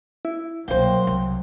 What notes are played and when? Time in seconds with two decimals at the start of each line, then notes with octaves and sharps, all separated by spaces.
0.25 E4
0.68 C2 B2 F#3 A#3 C5 G5
1.07 C2